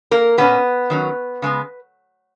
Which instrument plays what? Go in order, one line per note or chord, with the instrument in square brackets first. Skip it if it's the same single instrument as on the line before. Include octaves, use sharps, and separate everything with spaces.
[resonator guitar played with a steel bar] A#3 A#4
A#2 A#3 B3 C#4 B4
D#3 F#3 C#4
C#3 G#3 B3